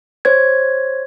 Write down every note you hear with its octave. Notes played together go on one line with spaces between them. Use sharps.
C5 C#5 G#6